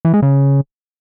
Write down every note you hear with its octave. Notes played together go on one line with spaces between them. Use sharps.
E3
G#3
C#3